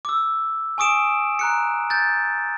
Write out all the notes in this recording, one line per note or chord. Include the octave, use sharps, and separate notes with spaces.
D6 E6
G#5 C#6 D#6 D7 E7
A#5 F#6 C#7
G6 A6